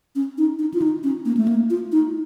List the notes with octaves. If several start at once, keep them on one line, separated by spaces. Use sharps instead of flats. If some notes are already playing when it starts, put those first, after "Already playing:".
C#4
D#4
D#4
F4
D#4
C#4
A#3
A3
A#3
F4
D#4